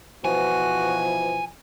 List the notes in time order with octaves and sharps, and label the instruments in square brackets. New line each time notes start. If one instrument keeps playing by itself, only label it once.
[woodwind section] B2 E3 F3 [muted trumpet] F#4 [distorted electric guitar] G#5